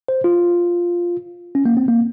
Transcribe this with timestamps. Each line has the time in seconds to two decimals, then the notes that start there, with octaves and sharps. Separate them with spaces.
0.08 C5
0.24 F4
1.55 C#4
1.66 A#3
1.77 C4
1.88 A#3